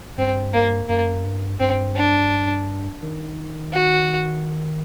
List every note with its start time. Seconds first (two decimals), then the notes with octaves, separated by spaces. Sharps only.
0.18 G2 C4
0.53 A#3
0.88 F#2 A#3
1.24 G2
1.60 G2 C4
1.96 D4
3.03 D#3
3.73 F#4